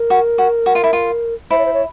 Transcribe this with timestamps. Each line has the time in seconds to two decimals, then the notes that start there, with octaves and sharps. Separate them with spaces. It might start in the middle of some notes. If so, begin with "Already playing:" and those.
Already playing: A#4
0.10 F#4
0.38 F#4
0.66 F#4
0.75 F4
0.84 E4
0.93 F4
1.50 E4 C5
1.58 C#5
1.65 C5
1.73 C#5